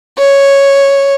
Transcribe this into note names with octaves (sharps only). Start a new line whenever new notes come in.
C#5